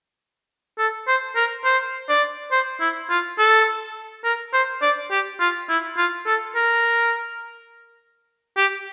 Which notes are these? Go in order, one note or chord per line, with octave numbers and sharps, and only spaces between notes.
A4
C5
A#4
C5
D5
C5
E4
F4
A4
A#4
C5
D5
G4
F4
E4
F4
A4
A#4
G4